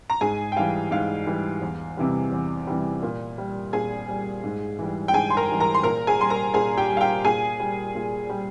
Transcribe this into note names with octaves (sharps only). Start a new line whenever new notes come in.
A#5
G#2 G#4 G#5
G5
E3 G3 F5
G#2 F5
E3 G3
E2
C3 E3 G3
E2
C3 E3 G3
A#2
G3
A#2 G#4 G#5
G3
G#2
E3 G3
G5
G#2 G#4 G#5
C6
A#4 A#5
E3 G3
A#4 A#5
C6
A#2 A#4 A#5
G#4 G#5
G3 C6
A#4 A#5
A#2 G#4 G#5
G4 G5
G3
F5
G4 G5
A#2 G#4 G#5
G3
A#2
G3